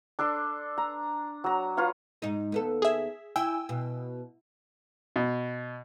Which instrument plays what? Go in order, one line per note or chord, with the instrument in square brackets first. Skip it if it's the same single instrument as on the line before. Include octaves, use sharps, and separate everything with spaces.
[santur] D4 A4 C6 D6
A#5
F#3 A#5
F4 B4 C#5 F5
[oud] G#2 D#4
D#2 B3 A4
[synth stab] G#4 E5
[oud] E4 [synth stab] G5 G#5 E6
[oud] B2
[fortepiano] B2